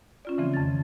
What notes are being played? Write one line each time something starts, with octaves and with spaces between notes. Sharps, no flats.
C#4 F4 D5
C#3 E3 F3 A3 C4
F2 D#3 A6